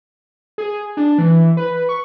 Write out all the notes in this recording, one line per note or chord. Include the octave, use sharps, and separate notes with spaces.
G#4
D4
E3
B4
C#6